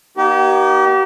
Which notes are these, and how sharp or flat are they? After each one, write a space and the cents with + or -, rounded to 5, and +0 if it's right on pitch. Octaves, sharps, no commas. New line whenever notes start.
A#3 +45 D#4 +0 G4 -35